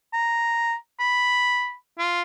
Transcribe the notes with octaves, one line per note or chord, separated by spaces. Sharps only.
A#5
B5
F4